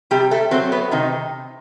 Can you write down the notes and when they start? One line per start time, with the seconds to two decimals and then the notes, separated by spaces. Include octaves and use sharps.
0.11 C3 G3 G4
0.31 A3 A4
0.51 F#3 A3 C4 C5
0.72 B3 B4
0.91 C3 D#3 D#4